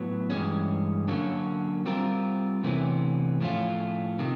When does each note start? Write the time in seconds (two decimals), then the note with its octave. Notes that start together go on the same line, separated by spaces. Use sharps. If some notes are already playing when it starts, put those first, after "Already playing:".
Already playing: A2 F#3 B3
0.30 G2 E3 G#3 C#4
1.08 D3 F#3 A#3 C#4
1.86 G3 C4 F4 A#4
2.63 E2 C3 E3 A3 C#4
3.41 A2 F3 A3 C#4 F4
4.19 C3 D#3